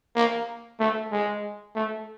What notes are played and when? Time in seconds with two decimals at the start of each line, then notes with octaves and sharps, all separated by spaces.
0.16 A#3
0.80 A3
1.12 G#3
1.75 A3